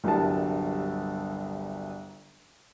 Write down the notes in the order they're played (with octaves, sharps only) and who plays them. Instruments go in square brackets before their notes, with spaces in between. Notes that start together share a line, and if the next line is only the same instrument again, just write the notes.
[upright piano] G1 C2 F#3 A#4 A5